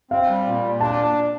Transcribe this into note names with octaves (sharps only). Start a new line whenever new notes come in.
C4 F5
G3
A#2
A#2
D4 A5